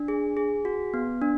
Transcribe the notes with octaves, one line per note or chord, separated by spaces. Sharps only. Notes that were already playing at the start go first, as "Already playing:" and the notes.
Already playing: D4
G#4
G#4
F#4
B3
D4